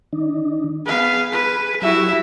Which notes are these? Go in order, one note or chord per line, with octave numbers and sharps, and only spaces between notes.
D#3 D4 D#4
B3 G#4 F5
B4
F#3 E4 F#4 G4 E5